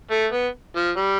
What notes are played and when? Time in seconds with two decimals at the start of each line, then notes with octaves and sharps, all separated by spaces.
0.11 A3
0.32 B3
0.76 F3
0.97 G3